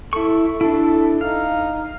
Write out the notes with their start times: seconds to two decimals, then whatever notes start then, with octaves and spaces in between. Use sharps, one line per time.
0.13 E4 A4 C#6
0.61 D4 E4 A4
1.21 D#4 F5